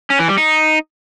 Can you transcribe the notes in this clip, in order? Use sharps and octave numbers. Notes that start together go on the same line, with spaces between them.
C#4
E3
G3
D#4